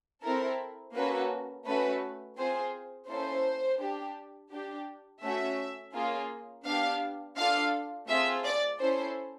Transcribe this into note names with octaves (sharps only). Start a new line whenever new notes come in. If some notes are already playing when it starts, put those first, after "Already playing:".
C4 E4 A4 A#4
A#3 C#4 F#4 A4 B4
A3 C#4 F#4 B4
C4 F4 G#4 C5
A#3 C#4 E4 A4 C5
D4 G4
D4 G4
A3 C#4 F#4 E5
A#3 C#4 F4 G#4
B3 D4 G4 F5
D4 F4 A4 F5
A3 C4 F4 G#4 E5
D5
C#4 E4 A4 C5